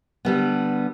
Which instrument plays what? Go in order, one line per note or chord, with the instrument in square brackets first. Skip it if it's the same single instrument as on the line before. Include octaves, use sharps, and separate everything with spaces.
[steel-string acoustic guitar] D3 G3 B3